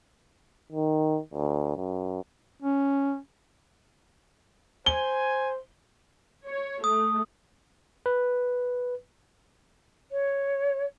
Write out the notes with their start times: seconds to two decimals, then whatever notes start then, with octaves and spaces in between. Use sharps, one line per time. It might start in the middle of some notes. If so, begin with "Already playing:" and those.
0.72 D#3
1.33 D2
1.77 F#2
2.62 C#4
4.86 C5 G#5 G7
6.45 C#5
6.84 A3 D#6
8.06 B4
10.11 C#5